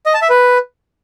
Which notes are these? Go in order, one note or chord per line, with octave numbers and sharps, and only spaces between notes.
D#5
A5
E5
B4